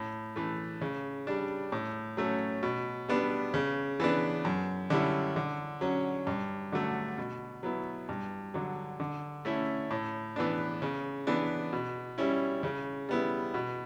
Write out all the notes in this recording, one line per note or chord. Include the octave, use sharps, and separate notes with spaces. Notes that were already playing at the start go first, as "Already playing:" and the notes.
Already playing: A2
E3 A3
C#3
G3 D4
A2
F#3 A3 C#4
B2
G3 B3 D4
C#3
E3 B3 D4
F#2
D3 G3 C#4 E4
D3
F#3 C#4
G2
D3 F#3 A3
B2
F#3 B3 E4
G2
D3 F#3
D3
A3 C#4 E4
A2
E3 B3 D4
C#3
E3 B3 D4
B2
G3 C#4 E4
C#3
G3 B3 E4
B2